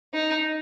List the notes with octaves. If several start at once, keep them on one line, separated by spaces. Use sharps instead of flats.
D#4